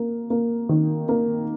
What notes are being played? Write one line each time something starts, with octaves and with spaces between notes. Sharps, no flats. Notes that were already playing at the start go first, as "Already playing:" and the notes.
Already playing: A#3
A#3
D#3
A#3